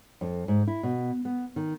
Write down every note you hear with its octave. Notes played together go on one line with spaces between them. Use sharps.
F2
G#2
E4
B2
B3
D#3